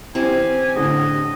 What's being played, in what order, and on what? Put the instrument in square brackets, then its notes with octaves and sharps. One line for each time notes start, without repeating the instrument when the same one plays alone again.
[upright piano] E3 [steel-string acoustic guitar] C4 C#4 G4 [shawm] G#5
[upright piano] A2 D3 [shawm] D#5